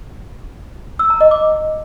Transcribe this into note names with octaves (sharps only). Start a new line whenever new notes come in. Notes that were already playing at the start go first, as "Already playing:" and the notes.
E6
A#5
D#5
D6